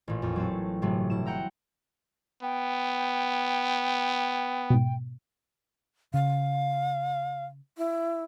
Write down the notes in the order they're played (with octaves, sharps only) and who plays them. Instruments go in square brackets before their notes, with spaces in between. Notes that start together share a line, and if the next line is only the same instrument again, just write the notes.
[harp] A1 A#2
F2
F#3 C4 A4
G1 A2 C3 F#3 A3
B2 E4 E7
F#5 G5 A#5 E6
[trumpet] B3 [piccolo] G5
[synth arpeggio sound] G#2 B2
[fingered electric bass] C#3 [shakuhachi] F5
[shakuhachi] E4